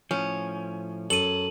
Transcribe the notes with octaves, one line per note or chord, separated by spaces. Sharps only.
A2 F3 C#4
F#2 A4 D#7 F#7